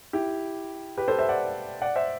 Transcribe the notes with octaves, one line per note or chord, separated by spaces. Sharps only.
E4 G4
G4 B4
A4 C5
C5 E5
D5 F#5
D5 F#5
C5 E5